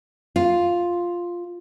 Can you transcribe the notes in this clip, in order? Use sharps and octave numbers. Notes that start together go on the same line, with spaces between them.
F4